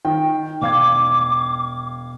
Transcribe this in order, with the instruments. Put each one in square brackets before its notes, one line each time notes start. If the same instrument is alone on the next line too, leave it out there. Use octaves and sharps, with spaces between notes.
[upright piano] D#3 [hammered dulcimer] G5
[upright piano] E1 F5 G#6 [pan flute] D6